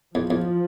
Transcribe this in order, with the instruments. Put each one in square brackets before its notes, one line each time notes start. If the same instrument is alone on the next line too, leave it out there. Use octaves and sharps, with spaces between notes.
[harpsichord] E2 [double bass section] F3
[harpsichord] E2